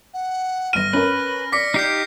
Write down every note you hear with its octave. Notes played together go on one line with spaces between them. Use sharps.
F#5
G1 F6 A#6 D#7
C#4 A#4 B4 B5
D5 D6 A#6 B6 C#7
D#4 G4 F5 G6 C7